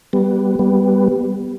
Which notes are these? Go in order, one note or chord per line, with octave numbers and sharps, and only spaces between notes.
G3 B3
G3 B3